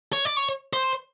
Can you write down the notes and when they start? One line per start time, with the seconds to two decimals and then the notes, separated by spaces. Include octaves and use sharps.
0.13 C#5
0.25 D5
0.37 C#5
0.73 C5